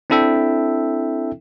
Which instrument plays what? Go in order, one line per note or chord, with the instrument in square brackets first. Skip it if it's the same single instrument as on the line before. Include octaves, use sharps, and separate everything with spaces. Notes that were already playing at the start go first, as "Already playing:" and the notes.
[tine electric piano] C4 D4 E4 A4 E5 G5